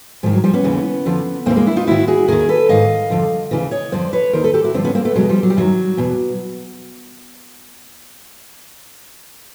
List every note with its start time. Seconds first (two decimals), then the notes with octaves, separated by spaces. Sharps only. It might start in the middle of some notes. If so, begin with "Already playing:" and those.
0.23 G#2 D#3 F3
0.33 F#3
0.44 F3 G3
0.54 B3 C#4
0.64 D#2 C#3 E3
1.05 F2 D3 F3
1.46 D#2 C#3 E3 A#3 C4
1.56 G#3 A#3
1.66 D4 E4
1.76 D#4 F4
1.87 G#2 D#3 E4 F#4
2.08 F#4 G#4
2.28 D#2 D#3 G#4 A#4
2.49 A4 B4
2.69 G#2 D#3 D#5 F5
3.10 F2 D3 F3
3.51 D2 C#3 E3
3.71 C#5 D#5
3.92 F2 D3 F3 C5 D5
4.13 B4 C#5
4.33 D#2 D#3 A#4 C5
4.44 A4 B4
4.54 G4 A4
4.64 E4 F#4
4.74 G2 D3 F3 C4 D4
4.84 B3 C#4
4.95 A#3 C4
5.05 A3 B3
5.15 E2 B2 F#3 G#3
5.29 F3 G3
5.43 F#3
5.50 G3
5.57 F#2 D#3 F#3
5.97 E2 B2